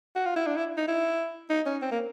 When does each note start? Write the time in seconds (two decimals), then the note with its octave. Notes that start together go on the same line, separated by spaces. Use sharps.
0.16 F#4
0.25 F4
0.36 E4
0.46 D4
0.56 E4
0.77 D#4
0.88 E4
1.50 D#4
1.66 C#4
1.82 C4
1.92 A#3